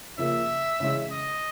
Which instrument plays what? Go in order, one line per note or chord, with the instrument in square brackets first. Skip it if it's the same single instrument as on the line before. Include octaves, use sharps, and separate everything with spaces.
[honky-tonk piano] C#3 F3 A#3 [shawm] E5
[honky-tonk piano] C#3 E3 G#3 C#4
[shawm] D#5